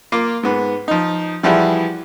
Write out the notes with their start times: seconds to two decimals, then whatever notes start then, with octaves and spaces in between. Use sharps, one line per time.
0.12 A#3 F4 D6
0.43 G#2 B3
0.88 F3 D#4
1.43 E3 F3 G3 E4 F#4 G#4